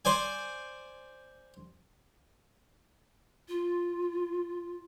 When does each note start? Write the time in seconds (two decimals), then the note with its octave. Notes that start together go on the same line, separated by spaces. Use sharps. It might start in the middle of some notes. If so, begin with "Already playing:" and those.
0.05 C5 D5 G#5
3.48 F4